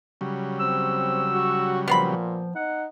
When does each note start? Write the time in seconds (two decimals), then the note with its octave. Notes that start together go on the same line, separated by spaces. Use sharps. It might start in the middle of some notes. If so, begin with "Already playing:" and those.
0.21 C#3 F#3 G3
0.60 C4 E6
1.33 F#4
1.88 A#2 F3 B3 C4 B5
2.55 D#4 F#5